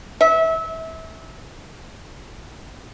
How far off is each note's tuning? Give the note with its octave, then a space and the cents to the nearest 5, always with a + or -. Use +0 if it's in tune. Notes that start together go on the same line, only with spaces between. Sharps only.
E5 -25